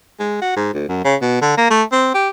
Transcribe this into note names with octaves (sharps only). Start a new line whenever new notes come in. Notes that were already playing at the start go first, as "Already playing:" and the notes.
G#3
F#4
G#2
D2
F#2
C#3
B2
D3
A#3
A3
C4
G4